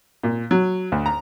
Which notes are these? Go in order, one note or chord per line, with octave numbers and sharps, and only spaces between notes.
A#2
F#3
D2
A#5